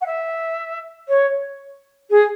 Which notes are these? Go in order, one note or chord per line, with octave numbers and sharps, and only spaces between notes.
F#5
E5
C#5
G#4